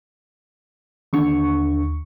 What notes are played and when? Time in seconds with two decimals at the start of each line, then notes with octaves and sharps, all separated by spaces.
1.13 D#2 D3 C#6